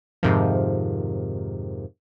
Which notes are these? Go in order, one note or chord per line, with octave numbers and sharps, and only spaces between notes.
F2 G#2 C3 D#3 F3